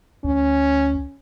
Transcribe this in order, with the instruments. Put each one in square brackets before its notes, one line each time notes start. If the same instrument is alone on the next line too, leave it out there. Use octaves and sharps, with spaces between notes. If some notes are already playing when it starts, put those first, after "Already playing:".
[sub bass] D2 [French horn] C#4